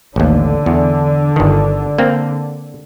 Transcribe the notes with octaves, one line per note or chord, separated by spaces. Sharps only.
A1 D#2 D3
E2
G1 D#3
A#3 C4